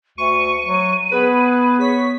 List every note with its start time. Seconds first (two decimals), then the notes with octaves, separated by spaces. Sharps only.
0.18 D2 C#6 D#7
0.65 F#3
1.12 B3 G#4 B4
1.81 C#5 C#6 B6